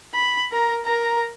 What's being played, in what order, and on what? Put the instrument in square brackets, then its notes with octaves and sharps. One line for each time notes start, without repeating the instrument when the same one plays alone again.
[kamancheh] B5
A#4 A#5
A#4 A#5